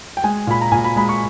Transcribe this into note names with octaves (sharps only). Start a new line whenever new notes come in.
G5
G#3 G#5
A#2 B5
A#5
A#2 G#5
B5
G#3 B5
C#6